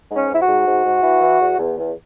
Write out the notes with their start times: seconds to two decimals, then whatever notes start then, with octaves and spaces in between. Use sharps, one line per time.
0.10 G#2
0.16 C#4
0.29 G#2 E4
0.41 F#4
0.47 G#2
0.66 G#2
0.84 G#2
1.03 E3
1.21 E3
1.40 E2
1.59 E2
1.78 E2